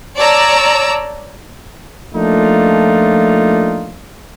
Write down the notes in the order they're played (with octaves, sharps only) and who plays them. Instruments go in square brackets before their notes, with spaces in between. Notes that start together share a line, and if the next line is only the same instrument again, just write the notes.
[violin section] C#5 D5 A5 A#5 E6
[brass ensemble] F3 A3 A#3 D4 D#4 F4